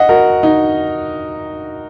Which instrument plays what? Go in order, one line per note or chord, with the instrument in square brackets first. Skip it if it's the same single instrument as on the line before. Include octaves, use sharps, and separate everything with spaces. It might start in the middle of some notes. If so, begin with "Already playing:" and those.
Already playing: [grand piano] D#5 F#5
F#4 A#4
D#4